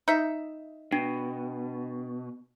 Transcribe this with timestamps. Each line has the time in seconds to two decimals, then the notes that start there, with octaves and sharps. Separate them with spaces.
0.08 D#4 E5
0.93 B2 D4